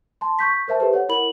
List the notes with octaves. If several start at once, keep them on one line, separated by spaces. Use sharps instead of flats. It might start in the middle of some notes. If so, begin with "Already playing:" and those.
A5 C6
C#6 G6 B6
A#4 C5 E5 A5
G4 A4 B4 C5
C#5 F#5
E4 A#4 B5 F#7